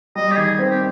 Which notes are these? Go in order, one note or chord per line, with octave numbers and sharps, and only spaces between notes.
G3 D#5
G4
D#3 G#4
C4
G4